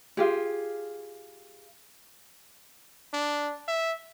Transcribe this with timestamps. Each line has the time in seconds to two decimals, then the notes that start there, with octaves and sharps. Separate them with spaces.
0.17 F4 G4 G#4
3.13 D4
3.68 E5